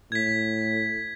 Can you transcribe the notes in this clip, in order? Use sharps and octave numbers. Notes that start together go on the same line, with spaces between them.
A2 G#6 B6